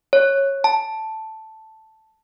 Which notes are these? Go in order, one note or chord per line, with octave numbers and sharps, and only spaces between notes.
C#5
A5